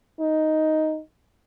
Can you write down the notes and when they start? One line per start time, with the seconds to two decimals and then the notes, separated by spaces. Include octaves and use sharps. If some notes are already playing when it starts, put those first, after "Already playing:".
0.21 D#4